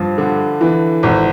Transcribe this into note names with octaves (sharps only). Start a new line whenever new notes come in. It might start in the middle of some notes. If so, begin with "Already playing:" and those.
Already playing: G2 F3
D3
E3
G#1